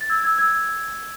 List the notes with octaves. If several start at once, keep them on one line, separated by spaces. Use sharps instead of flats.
A6
E6 G#6
E6 G#6
E6 G#6